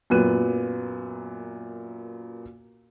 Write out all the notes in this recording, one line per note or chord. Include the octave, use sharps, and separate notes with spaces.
F#2 A#2 B3 F#6 D#7